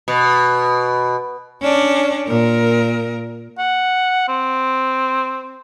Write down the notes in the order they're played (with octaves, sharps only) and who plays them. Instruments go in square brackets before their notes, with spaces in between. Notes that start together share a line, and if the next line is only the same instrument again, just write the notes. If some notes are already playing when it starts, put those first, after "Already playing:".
[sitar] B2
[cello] C#4 D4
A#2 A#4
[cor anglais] F#5
C4